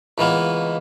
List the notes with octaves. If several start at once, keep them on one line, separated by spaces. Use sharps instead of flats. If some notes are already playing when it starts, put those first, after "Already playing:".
C#2 E3 G#3 A#3 B3